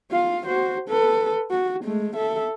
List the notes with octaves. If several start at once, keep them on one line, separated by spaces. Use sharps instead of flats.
F4 F5
F#4 C5
A4 B4
F#4
G#3 A3
A4 E5